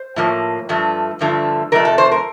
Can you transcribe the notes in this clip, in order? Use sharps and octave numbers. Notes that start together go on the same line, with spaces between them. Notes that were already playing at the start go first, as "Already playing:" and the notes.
Already playing: C5
A2 F3 A#3
G2 F3 A3
G2 D3 F3 A3
F2 C3 F3 A3 A#4
A4
C5
A#4